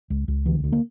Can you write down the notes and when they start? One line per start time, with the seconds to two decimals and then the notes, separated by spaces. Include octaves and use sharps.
0.10 C#2
0.28 C#2
0.45 D2 E3
0.64 D2
0.72 A#3